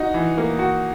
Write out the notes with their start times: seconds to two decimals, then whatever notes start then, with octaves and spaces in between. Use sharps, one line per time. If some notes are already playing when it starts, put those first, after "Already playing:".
Already playing: D#4 F#4
0.14 E3
0.38 A#3
0.59 F#4